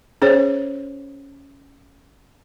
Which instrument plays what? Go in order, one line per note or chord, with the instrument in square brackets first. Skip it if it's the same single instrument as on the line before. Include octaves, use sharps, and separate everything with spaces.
[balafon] C#4 G#4 C5 C#5